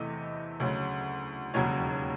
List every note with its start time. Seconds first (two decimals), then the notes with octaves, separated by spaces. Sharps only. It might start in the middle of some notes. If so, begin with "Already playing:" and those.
Already playing: E2 C3 E3 A3 D#5
0.60 D2 C#3 F#3
1.54 E1 D#2 C#3 F#3 C#5